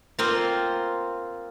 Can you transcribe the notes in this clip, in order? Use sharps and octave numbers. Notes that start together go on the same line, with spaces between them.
A#3 C4 F4